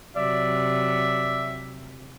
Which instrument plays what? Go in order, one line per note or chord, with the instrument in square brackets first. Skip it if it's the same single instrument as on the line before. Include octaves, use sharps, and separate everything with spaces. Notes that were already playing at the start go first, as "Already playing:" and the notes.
[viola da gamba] C3 F#3 [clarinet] D5 [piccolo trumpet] E5